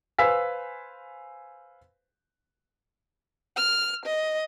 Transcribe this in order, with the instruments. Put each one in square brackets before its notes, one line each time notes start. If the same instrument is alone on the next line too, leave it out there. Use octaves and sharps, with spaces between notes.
[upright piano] B4 C5 F5 G#5 E6 B6
[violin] F6
D#5